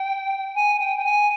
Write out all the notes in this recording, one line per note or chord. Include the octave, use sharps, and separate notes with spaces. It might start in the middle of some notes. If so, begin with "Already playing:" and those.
Already playing: G5
G#5
G5
G5
G#5